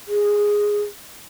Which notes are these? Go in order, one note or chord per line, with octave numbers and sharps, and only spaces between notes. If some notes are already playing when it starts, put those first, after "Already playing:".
G#4